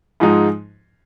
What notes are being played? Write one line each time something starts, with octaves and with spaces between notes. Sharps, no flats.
G#2 F3 G#3 D#4